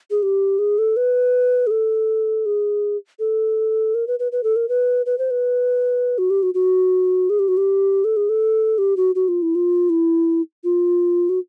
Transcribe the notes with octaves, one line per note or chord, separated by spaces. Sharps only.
G#4
G4
G#4
A4
B4
G#4
A4
G#4
A4
A#4
B4
B4
B4
A4
A#4
B4
B4
C5
B4
F#4
G4
F#4
F#4
G#4
G4
F#4
G4
A4
G#4
A4
G4
F#4
F#4
F4
E4
F4
E4
F4
F#4